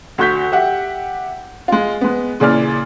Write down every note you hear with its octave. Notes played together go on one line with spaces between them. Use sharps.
D2 F#4 C#6 G6 B6
G4 E5 F#5
G#3 F4
G#3 B3
A#2 C#3 E3 D5 F6